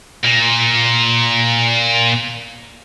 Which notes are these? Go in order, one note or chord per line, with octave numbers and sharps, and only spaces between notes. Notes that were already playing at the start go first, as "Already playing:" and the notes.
A#2 A#3